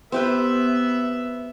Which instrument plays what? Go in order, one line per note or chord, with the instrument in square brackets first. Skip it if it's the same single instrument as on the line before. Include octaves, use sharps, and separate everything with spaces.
[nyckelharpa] B3 E5 [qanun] C4 G4 B4